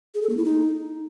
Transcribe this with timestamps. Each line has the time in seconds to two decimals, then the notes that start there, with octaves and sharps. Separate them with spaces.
0.15 G#4
0.22 A4
0.30 A#3
0.37 E4
0.45 D#4